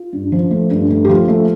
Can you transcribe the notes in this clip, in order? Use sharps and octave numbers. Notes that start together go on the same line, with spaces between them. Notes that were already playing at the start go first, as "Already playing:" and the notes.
Already playing: F4
G2
F3
A3
G2
A3
G4
F3 F4
A3